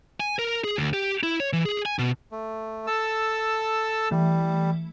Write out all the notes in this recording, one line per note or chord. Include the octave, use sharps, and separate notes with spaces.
G#5
A#4
G#4
D2
G4
E4
C#5
E3
G#4
G#5
B2
A3
A4 A5 E6
E3 G3 A3